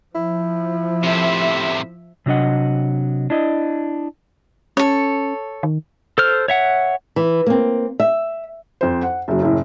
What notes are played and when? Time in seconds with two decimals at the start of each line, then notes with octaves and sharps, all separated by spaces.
0.15 F3 E4
1.03 A2 C3 E5
2.26 C3 F#3 D4 D#5 F#5
3.30 D4 E4 D#5
4.77 C#4 A4 C#5
5.63 D#3
6.18 A4 C5 F6
6.48 C#5 E5 F#5
7.16 E3
7.46 A#3 C4
8.00 E5
8.81 F2 C5
9.02 F#5
9.28 F#1 F#3
9.41 F#1 A2